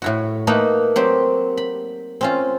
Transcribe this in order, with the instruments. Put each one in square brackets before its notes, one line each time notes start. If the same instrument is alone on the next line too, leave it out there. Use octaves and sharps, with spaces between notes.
[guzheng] A2 E4 F#4
A3 A#3 D#4 B4 F#5 B5
F#3 C4 G4
B5
C4 C#4 F4